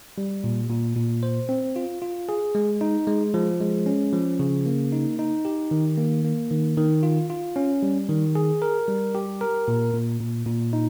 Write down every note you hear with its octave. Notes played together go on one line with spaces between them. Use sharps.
G3
A#2
A#2
A#2
C5
C4
F4
F4
G#4
G#3
D#4
G#3
F3
G#3
C#4
F3
C#3
A#3
D#4
D#4
G4
D#3
A#3
A#3
D#3
D#3
F4
F4
C#4
G3
D#3
G#4
A#4
G3
G4
A#4
A#2
A#2
A#2
A#2
D#4